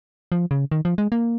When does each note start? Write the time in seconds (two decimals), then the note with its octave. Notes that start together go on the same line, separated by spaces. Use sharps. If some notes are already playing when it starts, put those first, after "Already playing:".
0.32 F3
0.51 C#3
0.72 D#3
0.85 F3
0.98 G#3
1.12 A#3